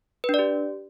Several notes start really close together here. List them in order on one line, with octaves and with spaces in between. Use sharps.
B4 D4 D5 G4